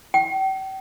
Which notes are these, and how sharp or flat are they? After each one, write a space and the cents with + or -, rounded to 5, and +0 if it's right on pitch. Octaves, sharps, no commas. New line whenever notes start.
G5 -40